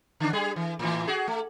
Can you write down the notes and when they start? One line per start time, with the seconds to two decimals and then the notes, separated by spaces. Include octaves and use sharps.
0.20 D3 D4
0.33 G3 G#4
0.56 E3
0.79 A2 E3
1.07 F#4 G#4
1.28 A3